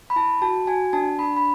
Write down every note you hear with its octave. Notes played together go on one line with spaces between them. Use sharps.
B5
E4 A5
F#4 A5
F#4 G#5
D4 A5
D4 B5
B5